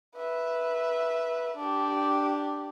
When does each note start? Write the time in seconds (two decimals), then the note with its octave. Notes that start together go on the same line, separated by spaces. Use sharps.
0.15 B4 E5
1.57 D4 G4